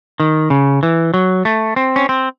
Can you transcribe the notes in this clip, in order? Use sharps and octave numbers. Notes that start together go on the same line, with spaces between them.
D#3
C#3
E3
F#3
A3
C4
C#4
C4